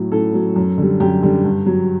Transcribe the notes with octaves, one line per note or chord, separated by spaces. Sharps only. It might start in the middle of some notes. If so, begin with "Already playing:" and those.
Already playing: A2 F#3
A2 A4
F#3
F#2
D3 G3
F#2 G4
D3 G3
G2
F#3